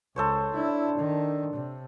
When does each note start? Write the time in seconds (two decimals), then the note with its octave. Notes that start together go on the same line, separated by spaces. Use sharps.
0.16 C#2 A4 C5 C#5
0.55 D4 E4
0.97 D#3
1.53 C3